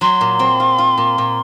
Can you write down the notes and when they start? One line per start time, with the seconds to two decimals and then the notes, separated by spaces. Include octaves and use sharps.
0.01 F#3 C6
0.21 A#2
0.39 C4
0.60 F4
0.78 F4
0.98 A#2
1.18 A#2